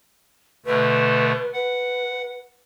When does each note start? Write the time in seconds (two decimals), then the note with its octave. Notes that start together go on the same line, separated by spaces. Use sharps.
0.66 B2 D3 A3 B4
1.54 B4 F#5